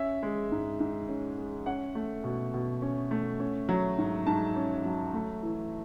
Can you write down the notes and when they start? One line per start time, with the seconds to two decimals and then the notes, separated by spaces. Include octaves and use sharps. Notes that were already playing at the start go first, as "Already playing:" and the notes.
Already playing: C#4 E5
0.23 G#3
0.52 G#2
0.80 G#2
1.09 C#4
1.38 G#3
1.66 C#4 F#5
1.95 A3
2.24 B2
2.54 B2
2.82 C#4
3.11 A3
3.40 C#4
3.69 F#3
3.98 G#2
4.27 G#2 A5
4.56 C#4
4.85 F#3
5.14 A3
5.43 E3